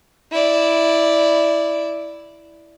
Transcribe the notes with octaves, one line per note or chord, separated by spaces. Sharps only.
E4 D5